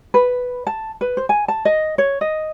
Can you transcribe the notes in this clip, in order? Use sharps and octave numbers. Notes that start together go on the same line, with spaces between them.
B4
A5
B4
C5
G#5
A5
D#5
C#5
D#5